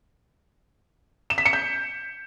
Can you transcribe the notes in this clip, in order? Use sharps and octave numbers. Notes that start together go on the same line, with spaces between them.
E7
B6
C#7
G6